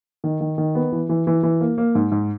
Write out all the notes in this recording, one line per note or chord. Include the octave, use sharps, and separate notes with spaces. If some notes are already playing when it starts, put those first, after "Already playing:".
D#3
D#3
D#3
B3
E3
E3
E3
E3
A#3
A#3
G#2
G#2